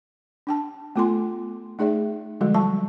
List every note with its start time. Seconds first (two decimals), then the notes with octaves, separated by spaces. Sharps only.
0.47 D4 G5 A5
0.96 A3 B3 F4 A4 G#5 C6
1.79 A3 D#4 G#4 D5 E5
2.41 D3 F3 G3 G#3 F#4 A4
2.54 F#3 G3 A5 C#6